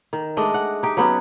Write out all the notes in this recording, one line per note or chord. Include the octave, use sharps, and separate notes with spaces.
D#3
G#3 A3 D4 D#5
F#5
D#4 G4
F#3 B3 C#4